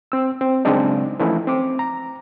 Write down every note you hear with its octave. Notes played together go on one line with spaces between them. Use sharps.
C4 E6
C4
C#3 F#3 G#3 C4 D4 D#4
E3 F3 A3 C#4 D#4 E4
C4 D6
A#5